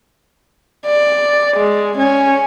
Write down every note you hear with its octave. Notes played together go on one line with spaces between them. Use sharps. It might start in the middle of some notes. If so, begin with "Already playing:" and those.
D5
G#3
C#4